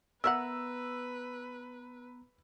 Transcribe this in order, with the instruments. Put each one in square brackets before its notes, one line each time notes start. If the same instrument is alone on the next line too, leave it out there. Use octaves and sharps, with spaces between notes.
[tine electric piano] B3 A#5 [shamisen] A#4 E5 F#5 [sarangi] B4 [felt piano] E6